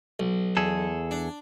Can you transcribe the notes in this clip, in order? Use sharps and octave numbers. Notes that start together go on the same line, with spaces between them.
B1
E2 G#4 A4
D4